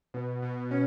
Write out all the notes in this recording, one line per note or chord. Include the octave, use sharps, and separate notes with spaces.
B2
B2
C#4